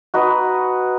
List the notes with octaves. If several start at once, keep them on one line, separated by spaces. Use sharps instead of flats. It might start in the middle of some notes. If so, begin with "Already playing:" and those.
D#4 F#4 B4 D#5